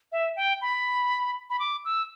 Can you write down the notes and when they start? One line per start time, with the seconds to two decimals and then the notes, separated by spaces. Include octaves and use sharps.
0.12 E5
0.36 G5
0.61 B5
1.50 B5
1.59 D6
1.85 E6